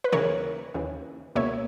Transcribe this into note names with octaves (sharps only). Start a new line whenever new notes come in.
B4
D#2 C#3 E3 A#4 C#5
D#2 C#3 E3
C#2 B2 A#3 C#5 E5